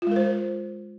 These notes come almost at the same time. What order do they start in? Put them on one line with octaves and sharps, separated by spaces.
F4 G#3 A#4 C5